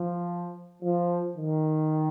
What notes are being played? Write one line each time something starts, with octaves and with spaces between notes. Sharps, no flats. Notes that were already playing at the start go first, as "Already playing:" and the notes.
Already playing: F3
F3
D#3